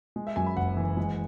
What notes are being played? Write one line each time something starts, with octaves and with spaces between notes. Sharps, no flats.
G#3
E5
F#2 G#5
B5
F#1 F#5
E3
G#3